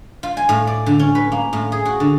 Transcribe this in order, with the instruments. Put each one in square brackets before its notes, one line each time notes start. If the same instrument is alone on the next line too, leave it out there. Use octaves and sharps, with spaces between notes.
[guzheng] F4
G#5
A2
D5
D3
C#4
B4
A#3
A2
G#4
F#4
D3